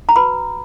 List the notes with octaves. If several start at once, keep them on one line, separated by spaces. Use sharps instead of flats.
A#5
F#4 B4 B5